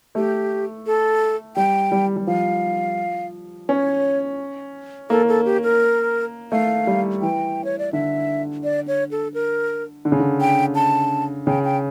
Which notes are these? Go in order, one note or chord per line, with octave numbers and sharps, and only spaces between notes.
A3 G4
A4
G3 G5
G3
G3
F3 F5
C#4 C#5
A#3 A4
A4
G4
A#4
A3 F5
G3
E3 G5
C#5
D5
D3 E5
D5
C#5
A4
A#4
D3
C#3
D3
G5
A5
C#3 G5
G5